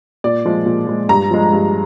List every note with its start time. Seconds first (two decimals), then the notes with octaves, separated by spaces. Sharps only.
0.24 A#2 D5
0.46 F3 G#3
0.66 A#2
0.87 F3 G#3
1.09 G2 A#5
1.31 F3 G#3
1.52 G2